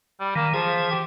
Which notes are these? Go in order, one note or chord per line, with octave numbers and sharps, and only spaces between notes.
G3
D#3 E3 A#3
E3 F3 G#4
G4